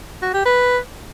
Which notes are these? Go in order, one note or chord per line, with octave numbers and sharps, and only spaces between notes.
F#4
G4
B4